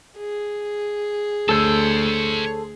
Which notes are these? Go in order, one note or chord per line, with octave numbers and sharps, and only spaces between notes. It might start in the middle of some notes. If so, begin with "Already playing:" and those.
G#4
D2 A4 C5 C#5 A5 E6